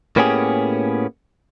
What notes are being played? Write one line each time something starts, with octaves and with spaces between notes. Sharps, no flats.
A2 A#3 B3 C#4 G4 G#4